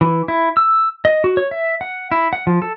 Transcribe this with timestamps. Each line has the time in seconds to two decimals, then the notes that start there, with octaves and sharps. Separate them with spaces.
0.01 E3
0.28 E4
0.57 E6
1.05 D#5
1.24 F#4
1.37 C#5
1.51 E5
1.81 F#5
2.12 E4
2.33 F#5
2.47 F3
2.62 A4